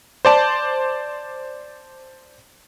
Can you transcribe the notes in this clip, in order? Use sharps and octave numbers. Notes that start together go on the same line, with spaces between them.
C5 D5 A5